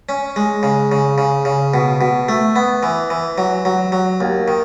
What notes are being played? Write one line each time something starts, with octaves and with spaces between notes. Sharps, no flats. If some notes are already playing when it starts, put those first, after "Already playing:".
C#4
G#3
C#3
C#3
C#3
C#3
B2
B2
A3
B3
E3
E3
F#3
F#3
F#3
D#2
D#3